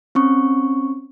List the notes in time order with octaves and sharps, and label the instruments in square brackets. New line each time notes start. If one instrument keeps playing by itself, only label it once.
[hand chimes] C4 C#4 C#6